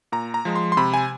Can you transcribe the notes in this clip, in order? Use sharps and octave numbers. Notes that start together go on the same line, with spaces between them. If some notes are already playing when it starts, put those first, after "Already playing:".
A#2 A#5
A#5
F3 G#3
C6
C6
C3 B5
G#5